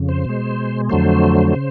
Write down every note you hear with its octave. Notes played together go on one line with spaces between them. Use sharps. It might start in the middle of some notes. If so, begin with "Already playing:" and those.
Already playing: F2 C#3
C5
B2 G#3
F2 D3 F#3 A3 C5
C#3